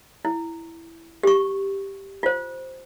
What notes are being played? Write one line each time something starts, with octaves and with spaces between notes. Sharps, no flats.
E4
G4 C#6
F4 C5